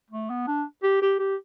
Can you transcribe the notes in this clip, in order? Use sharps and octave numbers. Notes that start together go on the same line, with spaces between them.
A3
B3
D4
G4
G4
G4